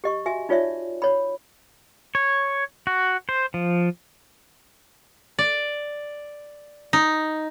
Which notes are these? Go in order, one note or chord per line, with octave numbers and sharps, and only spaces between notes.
G4 D#5 C#6
F#4 E5 G#5
D#4 F4 C#5 D5 E5
C#5 B5
C#5
F#4
C5
F3
D5
D#4